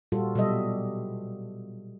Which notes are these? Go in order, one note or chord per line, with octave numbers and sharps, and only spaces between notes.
A#2 G3 F4 F#4 A4
B2 F#3 G3 A4 D#5 E5